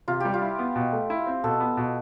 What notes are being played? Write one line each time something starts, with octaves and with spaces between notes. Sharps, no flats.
C3 F4
G3 G4
F4
E4
B3
B2
A3
E4
C4
B2 A4
B3
B2